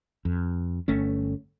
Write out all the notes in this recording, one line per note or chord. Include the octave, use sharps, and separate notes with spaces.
F2
G1 A3 C#4